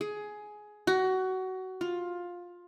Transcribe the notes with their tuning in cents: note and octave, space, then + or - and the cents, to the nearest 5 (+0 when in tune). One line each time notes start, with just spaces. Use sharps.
G#4 +15
F#4 +20
F4 +15